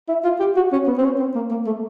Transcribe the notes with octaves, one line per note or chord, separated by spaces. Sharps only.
E4
F4
G4
F#4
C#4
B3
C4
C#4
C4
A#3
A#3
A3